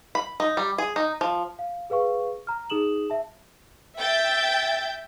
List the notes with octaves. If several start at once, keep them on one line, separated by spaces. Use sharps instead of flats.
B5
D#4
G3
G#4
D#4
F3
F5
G#4 B4 F5 C#6
A#5 F6
D#4 G#4 D#6 E7 F#7
E5 A5
E5 G5 G6 A6